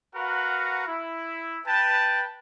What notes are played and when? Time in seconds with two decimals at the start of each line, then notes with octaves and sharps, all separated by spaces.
0.15 F#4 A#4 B4 F5 F#5 A#5
0.87 E4
1.66 B4 G5 A5